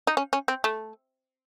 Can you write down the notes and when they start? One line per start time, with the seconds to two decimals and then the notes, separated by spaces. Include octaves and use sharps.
0.07 D#4
0.17 C#4
0.33 C#4
0.48 C4
0.64 A3